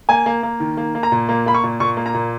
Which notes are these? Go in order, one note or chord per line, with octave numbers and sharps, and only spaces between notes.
A#3 G#5
A#3
A#3
D#3
A#3
A#3
A#5
A#2
A#3
A#3 B5
C#6
A#2
A#2 C#6
A#3
A#5
A#2